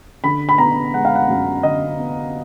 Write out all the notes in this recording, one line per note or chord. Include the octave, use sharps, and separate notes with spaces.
D3 B5
B5
B3 A#5
G#3 F#5
F5
F#5
F#2
D3 D#5
B3